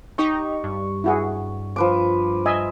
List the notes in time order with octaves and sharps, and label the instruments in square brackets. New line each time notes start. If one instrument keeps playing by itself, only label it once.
[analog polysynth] D#4 G4 [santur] C#6
[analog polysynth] G2
[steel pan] E4 F#4 G#4
[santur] F3 B4 D6
[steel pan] D#5 E5 G#5